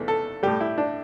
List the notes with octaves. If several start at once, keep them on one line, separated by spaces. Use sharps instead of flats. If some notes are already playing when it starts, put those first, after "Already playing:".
Already playing: E2 E3 A3
A4
A2 G3 G4
E4
D4